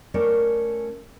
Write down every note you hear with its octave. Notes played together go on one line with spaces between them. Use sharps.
A3 C#4 A#4 D5